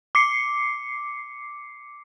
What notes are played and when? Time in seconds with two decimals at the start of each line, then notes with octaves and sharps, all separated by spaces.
0.15 D6 C7 C#7